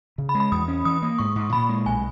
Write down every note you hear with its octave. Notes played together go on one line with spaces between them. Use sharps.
C#3
B5
G#3
B5
E2 D#6
C#4
E3 D#6
A#3
G#2 C#6
G#2
A#2 B5
G#3
B1 G#5